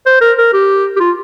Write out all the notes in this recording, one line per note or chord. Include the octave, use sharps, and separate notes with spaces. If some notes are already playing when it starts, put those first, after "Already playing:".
C5
A#4
A#4
G4
G4
F4